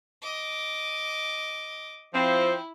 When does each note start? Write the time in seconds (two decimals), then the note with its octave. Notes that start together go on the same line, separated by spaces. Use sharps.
0.22 D#5 D6
2.14 F3 C4 E4